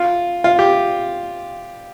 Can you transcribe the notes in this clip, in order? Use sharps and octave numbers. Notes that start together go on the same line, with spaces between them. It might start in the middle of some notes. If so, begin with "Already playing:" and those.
Already playing: F4
F4
G4